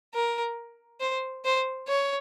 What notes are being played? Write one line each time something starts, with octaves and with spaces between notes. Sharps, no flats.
A#4
C5
C5
C#5